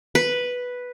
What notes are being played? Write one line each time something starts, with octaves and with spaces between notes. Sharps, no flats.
B4